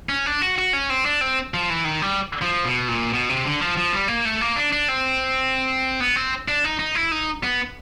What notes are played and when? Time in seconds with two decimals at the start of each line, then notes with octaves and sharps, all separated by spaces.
0.09 C#4
0.26 D4
0.42 F#4
0.58 F#4
0.73 C#4
0.90 C4
1.05 D4
1.21 C4
1.54 F3
1.70 E3
1.85 D#3
2.02 G3
2.42 F3
2.65 B2
2.88 A#2
3.13 B2
3.29 C3
3.44 D3
3.61 F3
3.77 F3
3.93 G3
4.08 A#3
4.25 A3
4.41 A#3
4.56 D4
4.72 D4
4.88 C4
6.00 B3
6.16 C4
6.48 D4
6.64 D#4
6.79 D#4
6.95 E4
7.12 D#4
7.43 B3